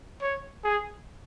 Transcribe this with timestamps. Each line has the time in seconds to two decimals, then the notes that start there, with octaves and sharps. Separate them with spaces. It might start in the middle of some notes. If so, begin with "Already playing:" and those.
0.22 C#5
0.64 G#4